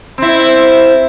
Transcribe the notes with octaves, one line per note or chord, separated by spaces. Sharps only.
C4 E4